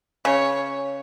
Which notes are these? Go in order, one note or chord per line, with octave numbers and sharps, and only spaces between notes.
C#3 C#5